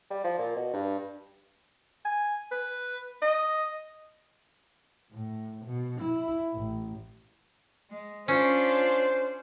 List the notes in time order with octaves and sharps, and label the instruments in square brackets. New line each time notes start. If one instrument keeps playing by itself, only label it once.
[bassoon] G3
F3
A#2
B2
G2
[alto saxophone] G#5
B4
D#5
[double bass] A2
B2
E4
A1
[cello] G#3
[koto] C#4 [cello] D4 F4 [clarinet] C5